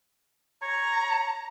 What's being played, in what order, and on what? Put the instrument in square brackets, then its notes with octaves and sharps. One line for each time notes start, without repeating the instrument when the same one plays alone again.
[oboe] C#5 [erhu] A#5